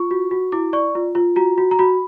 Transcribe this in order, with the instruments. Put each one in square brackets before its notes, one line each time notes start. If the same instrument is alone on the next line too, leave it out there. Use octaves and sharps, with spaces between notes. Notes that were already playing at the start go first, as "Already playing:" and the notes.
Already playing: [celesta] F4 C#6
F#4
F#4
E4 D6
D5 C#6
F4
F4
F#4 A#5
F#4
A#5
F#4 B5